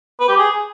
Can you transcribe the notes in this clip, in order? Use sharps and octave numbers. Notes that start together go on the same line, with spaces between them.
B4
G4
G#4